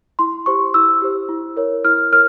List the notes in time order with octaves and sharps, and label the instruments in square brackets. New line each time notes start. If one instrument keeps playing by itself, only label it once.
[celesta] E4 C6
G4 C5 C#6
E4 E6
G4 C5
E4
A#4 C#5
E4 F6
A#4 C#5 F6